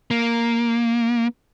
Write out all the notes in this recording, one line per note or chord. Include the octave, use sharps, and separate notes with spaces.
A#3